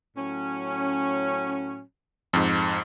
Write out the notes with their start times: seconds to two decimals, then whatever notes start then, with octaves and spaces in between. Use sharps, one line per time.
0.17 A2 F#3 C#4
2.33 F2 G#2